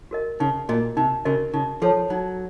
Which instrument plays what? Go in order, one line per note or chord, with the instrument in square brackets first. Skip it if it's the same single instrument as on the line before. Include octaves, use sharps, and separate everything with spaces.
[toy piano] F#4 A#4 D#5
[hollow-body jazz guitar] C#3 [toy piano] D#4
[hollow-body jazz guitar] A#2 [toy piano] F#4 A#4 D#5
[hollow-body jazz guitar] C3 [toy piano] D#4
[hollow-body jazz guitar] C#3 [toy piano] F#4 A#4 D#5
[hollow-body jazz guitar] C#3 [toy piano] D#4
[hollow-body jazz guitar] F3 [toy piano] A4 C#5 A5
[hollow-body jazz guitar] F#3 [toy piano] D#4